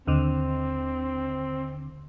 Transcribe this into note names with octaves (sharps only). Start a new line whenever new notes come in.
D#2 D3 C4